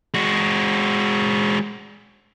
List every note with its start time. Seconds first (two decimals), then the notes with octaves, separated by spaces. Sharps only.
0.14 G#3 F#4